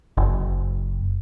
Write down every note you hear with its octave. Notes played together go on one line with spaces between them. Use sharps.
F#1